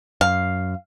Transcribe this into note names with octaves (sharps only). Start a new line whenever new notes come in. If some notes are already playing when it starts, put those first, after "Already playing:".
F#2 F5